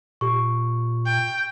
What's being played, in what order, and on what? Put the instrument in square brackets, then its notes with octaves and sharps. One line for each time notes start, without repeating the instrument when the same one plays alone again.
[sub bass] A#2 [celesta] G4 C#6
[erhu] G5